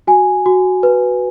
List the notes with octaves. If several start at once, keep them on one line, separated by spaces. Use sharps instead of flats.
F#4 G#5
F#4
B4